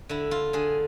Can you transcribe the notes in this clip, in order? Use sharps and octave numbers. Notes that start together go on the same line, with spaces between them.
D3 E4
F4
D3 G#4